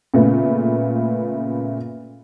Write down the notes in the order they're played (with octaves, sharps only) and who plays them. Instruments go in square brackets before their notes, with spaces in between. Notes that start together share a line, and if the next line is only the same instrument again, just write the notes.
[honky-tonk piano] A#2 C#3 A3 B3